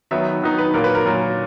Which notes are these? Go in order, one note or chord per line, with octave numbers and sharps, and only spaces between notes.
D#3 F#3 B3 D#4 E5
D#3 F#3 B3 D#4
B4
A#2 F#3 A#3 A#4
B4
A#4
A#2 F#3 A#3